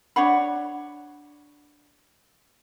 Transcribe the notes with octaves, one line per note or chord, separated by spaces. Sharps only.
D4 C#5 F#5 B5